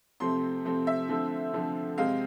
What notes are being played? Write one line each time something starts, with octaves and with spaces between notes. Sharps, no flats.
C3 F3 A3 C4 C6
C3 F3 A3 C4
E5
D3 F3 A3 C4
D3 F3 A3 C4
C3 G#3 C4 F5